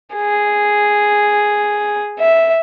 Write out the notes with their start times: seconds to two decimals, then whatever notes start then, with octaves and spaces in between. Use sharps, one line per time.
0.15 G#4
2.20 E5